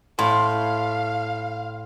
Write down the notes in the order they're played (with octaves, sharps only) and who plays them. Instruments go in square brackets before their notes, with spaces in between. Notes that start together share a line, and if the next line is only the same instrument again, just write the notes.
[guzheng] A2 [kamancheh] F5 [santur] C6